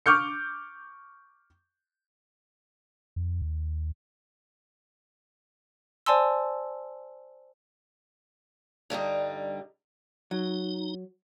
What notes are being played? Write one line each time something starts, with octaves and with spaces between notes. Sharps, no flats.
C#6 D6 F6 G6 C#7
F2
D#2
C5 D5 G#5 A5 C6 E6
G2 D3 G3 D#4
F#3 D#4